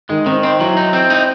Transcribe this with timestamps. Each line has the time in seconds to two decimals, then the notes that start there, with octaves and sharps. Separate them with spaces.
0.10 D#3 G#3
0.26 D#3 C4
0.43 C4 D#4
0.60 F#3 E4
0.77 D#4
0.93 C4
1.10 D#4